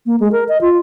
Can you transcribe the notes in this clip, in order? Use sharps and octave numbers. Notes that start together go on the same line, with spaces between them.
A#3
G#3
A#4
D#5
F4